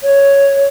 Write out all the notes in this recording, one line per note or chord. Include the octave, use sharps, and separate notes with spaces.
C#5